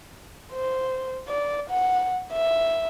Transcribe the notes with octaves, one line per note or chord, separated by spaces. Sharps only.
C5
D5
F#5
E5